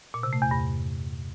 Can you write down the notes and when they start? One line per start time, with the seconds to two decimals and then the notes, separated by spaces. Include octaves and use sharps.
0.14 A#2
0.23 C3
0.33 A3
0.42 E2
0.51 G2